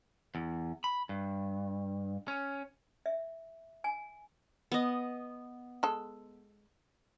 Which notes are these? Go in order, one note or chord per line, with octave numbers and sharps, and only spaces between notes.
E2
B5
G2
C#4
E5
G#5
B3 D#5
G#3 A4